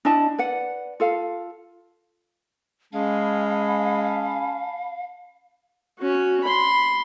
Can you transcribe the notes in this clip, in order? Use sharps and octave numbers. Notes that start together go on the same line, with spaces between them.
D4 E4 D#5 A5
B4 D5 F#5
F4 A4 F5
G#3 C#4 F5 A5 B5
C#4 F#4
B5 C6